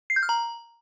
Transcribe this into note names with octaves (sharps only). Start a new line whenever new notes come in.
C7
G6
F6
A#5